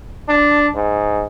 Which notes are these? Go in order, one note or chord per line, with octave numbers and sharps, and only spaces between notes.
D4
G#2